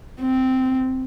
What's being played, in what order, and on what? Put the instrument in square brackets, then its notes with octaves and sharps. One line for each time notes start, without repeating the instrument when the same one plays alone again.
[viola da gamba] C4